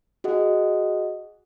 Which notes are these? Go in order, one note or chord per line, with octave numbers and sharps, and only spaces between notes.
F#4 G#4 D#5 F#5